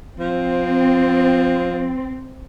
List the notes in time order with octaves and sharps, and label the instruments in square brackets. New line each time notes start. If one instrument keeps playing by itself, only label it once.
[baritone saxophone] F3 [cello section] C4